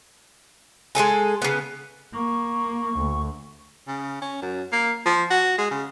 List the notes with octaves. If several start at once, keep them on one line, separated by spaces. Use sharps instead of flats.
G#3 G#4 A4 G#5
C#3 B3
A#3 C#6
D2
C#3
C#4
F#2
A#3
F3
F#4
G#3
C#3